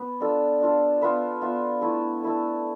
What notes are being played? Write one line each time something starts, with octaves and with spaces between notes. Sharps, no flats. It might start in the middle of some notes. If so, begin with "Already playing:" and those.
Already playing: B3 B4
D4 F4 A4
D4 F4 A4
B3 F4 B4 E5
B3 F4 B4 E5
A3 E4 A4
A3 E4 A4